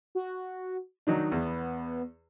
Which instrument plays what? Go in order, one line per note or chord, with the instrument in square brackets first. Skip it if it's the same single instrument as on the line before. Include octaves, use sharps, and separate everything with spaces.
[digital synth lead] F#4
[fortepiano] D#3 F#3 D4 [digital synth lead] D#4
[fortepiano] E2 [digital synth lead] B3